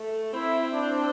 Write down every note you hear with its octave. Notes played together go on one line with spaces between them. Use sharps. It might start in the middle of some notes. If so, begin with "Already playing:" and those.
Already playing: A3
C4 E4
D4